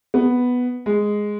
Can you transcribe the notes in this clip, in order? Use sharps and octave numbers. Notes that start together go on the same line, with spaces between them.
B3
G#3